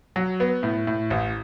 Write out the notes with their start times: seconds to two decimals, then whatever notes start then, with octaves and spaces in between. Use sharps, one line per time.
0.16 F#3
0.40 B3
0.63 A2
0.87 A2
1.10 A1